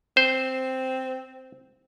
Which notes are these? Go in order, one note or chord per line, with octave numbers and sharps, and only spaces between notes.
C4 C5